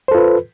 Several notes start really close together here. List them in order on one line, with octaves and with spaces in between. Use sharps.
C5 A4 F4 B4